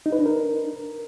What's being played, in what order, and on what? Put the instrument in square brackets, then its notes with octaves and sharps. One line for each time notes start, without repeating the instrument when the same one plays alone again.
[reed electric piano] D#4
B4
D4
A#4